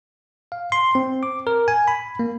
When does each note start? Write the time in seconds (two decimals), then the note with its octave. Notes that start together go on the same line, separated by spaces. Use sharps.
0.52 F5
0.72 C6
0.95 C4
1.23 D6
1.47 A#4
1.68 G#5
1.88 B5
2.19 A#3